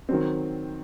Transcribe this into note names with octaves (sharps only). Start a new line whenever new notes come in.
D#3 F#3 C4